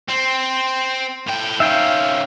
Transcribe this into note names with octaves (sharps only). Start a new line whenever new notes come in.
C4
A2 G5
D#3 C#4 E5 F5 G5